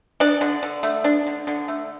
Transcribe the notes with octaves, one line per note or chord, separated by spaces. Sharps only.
D4 D5
D3
D3
A3
D4
D3
D3
A3